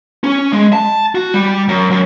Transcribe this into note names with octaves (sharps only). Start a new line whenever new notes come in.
C#4
G#3
A5
F#4
G3
F#2
F#2